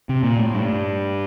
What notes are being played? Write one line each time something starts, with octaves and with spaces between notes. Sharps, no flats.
C3
A#2
A2
G2